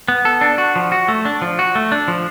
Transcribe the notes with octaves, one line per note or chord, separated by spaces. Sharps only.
B3
A4
D4
F#4
F3
F#4
A3
D4
F3
F#4
A3
D4
F3